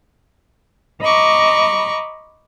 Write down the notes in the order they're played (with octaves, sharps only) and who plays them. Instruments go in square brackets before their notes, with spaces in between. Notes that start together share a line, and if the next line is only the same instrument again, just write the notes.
[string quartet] D#5 A#5 B5 C#6 D6